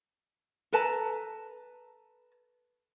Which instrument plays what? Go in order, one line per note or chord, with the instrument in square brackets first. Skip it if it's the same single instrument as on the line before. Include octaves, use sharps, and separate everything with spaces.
[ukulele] A4 B4 A5 A#5